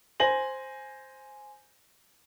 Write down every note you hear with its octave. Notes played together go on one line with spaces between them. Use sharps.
C5 G#5 A#6 F#7